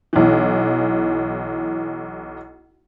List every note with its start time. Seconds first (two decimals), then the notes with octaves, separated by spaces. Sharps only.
0.13 B1 E3